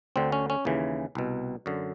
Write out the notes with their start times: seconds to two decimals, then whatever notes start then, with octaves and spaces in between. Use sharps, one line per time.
0.16 D2 D3 C4
0.32 C#4
0.50 C#4
0.65 D#2 C#3 E3
1.15 C2 B2
1.66 F#2 D3